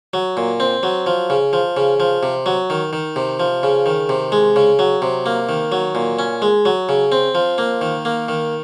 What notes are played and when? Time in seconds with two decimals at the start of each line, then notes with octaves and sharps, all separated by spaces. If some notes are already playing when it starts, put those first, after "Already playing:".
0.14 F#3
0.37 A#2
0.60 C4
0.83 F#3
1.06 F3
1.30 C#3
1.53 F3
1.77 C#3
2.00 F3
2.23 C3
2.46 F#3
2.70 D#3
2.93 D#3
3.16 C3
3.40 F3
3.63 C#3
3.86 D#3
4.09 C3
4.32 G#3
4.56 C#3
4.79 F#3
5.02 C3
5.26 A#3
5.49 D#3
5.72 F#3
5.95 A#2
6.19 C#4
6.42 G#3
6.65 F#3
6.89 C#3
7.12 C4
7.35 F3
7.58 A#3
7.81 D#3
8.05 A#3
8.28 D#3